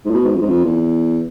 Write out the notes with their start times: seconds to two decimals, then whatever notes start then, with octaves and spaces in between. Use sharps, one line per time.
0.05 G#2
0.11 A2
0.14 B2
0.25 G#2
0.35 F2
0.41 G#2
0.49 F2
0.65 E2